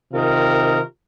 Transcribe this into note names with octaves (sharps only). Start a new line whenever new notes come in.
C3 D#3 F4 A#4